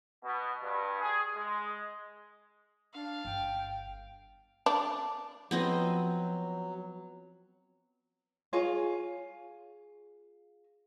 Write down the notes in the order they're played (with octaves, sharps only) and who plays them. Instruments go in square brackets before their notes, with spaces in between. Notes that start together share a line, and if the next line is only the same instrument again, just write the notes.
[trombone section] B2
G2
G#4
G#3
[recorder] D4 [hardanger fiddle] F5
[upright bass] G1 [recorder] G5
[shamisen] D4
[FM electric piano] F3 [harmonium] F#3 [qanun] B3 C4 D#5
[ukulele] F4 G#4 C#5 G#5